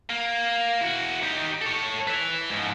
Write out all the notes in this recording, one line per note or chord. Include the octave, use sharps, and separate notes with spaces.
A#3
E4 F#4
D#4 G4
A4 C#5
B4 E5
G#2 F3